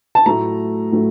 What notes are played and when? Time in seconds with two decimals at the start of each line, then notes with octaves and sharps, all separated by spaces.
0.15 A5
0.26 A2 F#3 A3 A#5
0.92 A2 F#3 A3